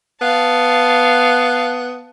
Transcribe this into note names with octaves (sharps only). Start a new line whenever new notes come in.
B3 F5 A5